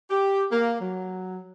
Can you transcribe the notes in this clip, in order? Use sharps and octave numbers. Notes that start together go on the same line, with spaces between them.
G4
A#3
F#3